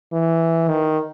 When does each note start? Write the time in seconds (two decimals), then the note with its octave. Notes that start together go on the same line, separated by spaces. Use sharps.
0.13 E3
0.68 D#3